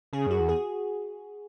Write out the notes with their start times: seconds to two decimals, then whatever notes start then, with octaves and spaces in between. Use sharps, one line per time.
0.13 C#3 G#4
0.27 F#2 F#4
0.40 E2
0.49 G#4